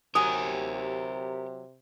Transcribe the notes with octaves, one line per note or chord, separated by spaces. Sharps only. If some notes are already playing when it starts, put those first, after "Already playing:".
C3 F#3 G4 A#4 G#5 D#6